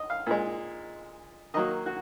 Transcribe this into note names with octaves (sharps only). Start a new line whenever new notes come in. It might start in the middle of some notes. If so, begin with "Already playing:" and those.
Already playing: D#5
F5
A#2 G#3
D#3 F#3 A#3 D#5
F#4